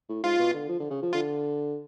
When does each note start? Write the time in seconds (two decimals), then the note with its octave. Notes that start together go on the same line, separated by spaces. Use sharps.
0.09 A2
0.23 G#2 F4
0.39 B2
0.54 D3
0.69 F3
0.80 D3
0.90 C#3
1.02 F3
1.13 D3 F4